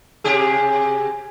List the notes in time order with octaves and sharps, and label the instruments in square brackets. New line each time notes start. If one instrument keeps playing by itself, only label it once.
[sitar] C3 G4 G#4